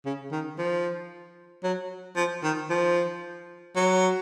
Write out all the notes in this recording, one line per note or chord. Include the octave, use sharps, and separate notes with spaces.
C#3
D#3
F3
F#3
F3
D#3
F3
F#3